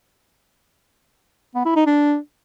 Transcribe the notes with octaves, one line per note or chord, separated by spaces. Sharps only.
B3
E4
D#4
D4